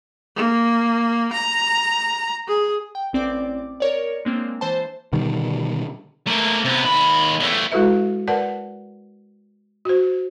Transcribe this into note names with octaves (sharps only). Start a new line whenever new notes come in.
A#3
A#5
G#4
G5
A1 C4 D5 D6
A#4 C#5 D5
G#3 A#3 C4 D4
E3 C5 A5
B2 D3 D#3 G3
A3 A#3
C3 B3
D#2 B5
E2 A3
G#3 E4 F#4 A4 B4 E5
A#4 B4 D5 F#5 A5
F#4 C5